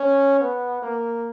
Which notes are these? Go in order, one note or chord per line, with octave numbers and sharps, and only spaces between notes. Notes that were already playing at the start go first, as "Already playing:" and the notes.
Already playing: C#4
B3
A#3